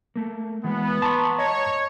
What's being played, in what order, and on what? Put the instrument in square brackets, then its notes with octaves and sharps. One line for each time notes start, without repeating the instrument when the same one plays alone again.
[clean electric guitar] A3 A#3
[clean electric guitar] E3 G#3 [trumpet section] B3
[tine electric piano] A5 A#5 C#6 [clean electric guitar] C6
[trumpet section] C#5 [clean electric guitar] D#5